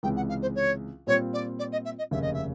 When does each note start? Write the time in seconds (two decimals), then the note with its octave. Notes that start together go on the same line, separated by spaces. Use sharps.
0.03 C#2 C3 E3 G#3 G5
0.16 F#5
0.29 F5
0.42 C5
0.55 C#5
1.07 A#2 G3 C4 F4 C#5
1.33 D5
1.59 D5
1.72 D#5
1.85 E5
1.99 D#5
2.11 F1 D#2 C#3 E5
2.22 D#5
2.34 E5